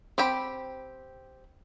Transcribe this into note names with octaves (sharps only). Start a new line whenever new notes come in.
C4 G4 G5 B5